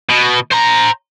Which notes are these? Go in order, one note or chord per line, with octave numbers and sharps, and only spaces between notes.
B2
C5 A#5